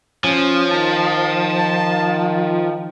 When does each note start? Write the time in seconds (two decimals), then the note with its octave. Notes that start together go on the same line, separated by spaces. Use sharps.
0.24 F3 C#4 G#5
0.72 D#3 A5